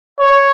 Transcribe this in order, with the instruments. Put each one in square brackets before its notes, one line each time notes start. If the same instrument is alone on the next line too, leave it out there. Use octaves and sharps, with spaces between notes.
[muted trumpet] C#5